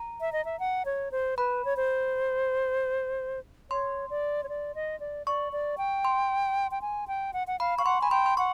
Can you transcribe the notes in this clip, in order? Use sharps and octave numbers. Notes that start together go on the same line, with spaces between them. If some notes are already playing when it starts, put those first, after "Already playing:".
Already playing: A#5
E5
D#5
E5
F#5
C#5
C5
B4 B5
C#5
C5
C#5 C6
D5
C#5
D5
D#5
D5
D5 C#6
D5
G5
C6
G5
G#5
G5
F#5
F#5
F5 B5
F5 C#6
F#5 C6
G#5 B5
G5 C6
C6
F#5 C#6